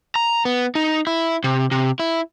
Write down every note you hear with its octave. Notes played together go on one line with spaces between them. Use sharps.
A#5
B3
D#4
E4
C3
C3
E4